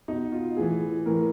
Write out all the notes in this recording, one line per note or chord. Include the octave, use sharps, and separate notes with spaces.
B2 D#4
F4
A2 E3 G#4
A2 E3 A#4